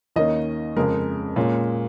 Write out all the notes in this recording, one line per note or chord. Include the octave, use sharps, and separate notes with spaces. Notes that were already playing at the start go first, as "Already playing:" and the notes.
D#2 D#3 A#3 C#4 D#5
F2 C#3 G#3 A#4
A#2 G#3 C#4